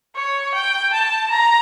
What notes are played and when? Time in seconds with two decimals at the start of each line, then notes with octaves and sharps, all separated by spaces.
0.16 C#5
0.54 G5
0.93 A5
1.30 A#5